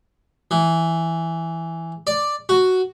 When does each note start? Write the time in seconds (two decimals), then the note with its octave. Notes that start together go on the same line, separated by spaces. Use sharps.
0.51 E3
2.07 D5
2.49 F#4